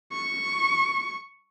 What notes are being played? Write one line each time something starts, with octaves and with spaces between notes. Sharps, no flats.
C#6